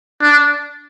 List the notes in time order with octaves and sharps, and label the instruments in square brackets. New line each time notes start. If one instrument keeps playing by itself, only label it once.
[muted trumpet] D4